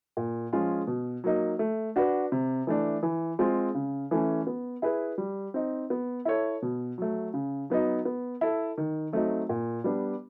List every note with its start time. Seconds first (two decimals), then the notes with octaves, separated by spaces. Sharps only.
0.17 A#2
0.53 F3 G#3 C#4 F4
0.87 B2
1.24 F#3 A#3 D#4
1.59 A3
1.96 D4 F#4 B4
2.32 C3
2.67 E3 A3 D4
3.03 E3
3.39 G#3 C4 F4
3.75 C#3
4.11 E3 A3 C#4
4.47 B3
4.82 E4 G#4 B4
5.18 G3
5.54 C4 D#4
5.90 B3
6.25 E4 A4 C#5
6.62 B2
6.98 F#3 A3
7.34 C#3
7.70 F#3 B3 D#4
8.05 B3
8.41 E4 A4
8.78 D#3
9.13 F#3 A3 C4 D#4
9.49 A#2
9.84 G3 B3 D4